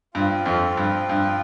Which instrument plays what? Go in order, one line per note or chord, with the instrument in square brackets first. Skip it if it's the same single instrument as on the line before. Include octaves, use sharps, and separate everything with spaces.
[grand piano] G2 [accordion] F3 C4 F4
[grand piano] F2
G2
G2